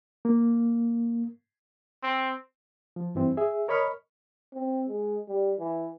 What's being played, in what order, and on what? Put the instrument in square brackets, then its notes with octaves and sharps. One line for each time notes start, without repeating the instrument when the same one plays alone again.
[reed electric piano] A#3
[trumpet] C4
[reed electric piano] F3
G2 E3 C4
G#4 E5
A#4 C#5 D#5 B5 C#6 F6
[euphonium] C4
G#3
G3
E3